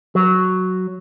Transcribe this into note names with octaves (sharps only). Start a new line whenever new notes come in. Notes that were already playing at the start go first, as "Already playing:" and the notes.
F#3